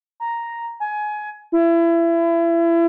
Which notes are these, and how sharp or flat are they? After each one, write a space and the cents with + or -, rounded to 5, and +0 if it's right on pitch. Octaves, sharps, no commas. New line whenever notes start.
A#5 +0
G#5 +20
E4 +30